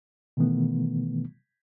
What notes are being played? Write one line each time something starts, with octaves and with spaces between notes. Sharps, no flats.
B2 D#3 E3 A3 B3